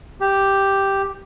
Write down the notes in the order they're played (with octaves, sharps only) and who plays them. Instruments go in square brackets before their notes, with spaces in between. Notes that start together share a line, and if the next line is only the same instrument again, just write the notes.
[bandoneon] G4